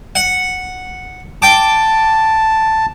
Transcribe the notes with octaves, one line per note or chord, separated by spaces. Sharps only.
F#5
G5 A5 D6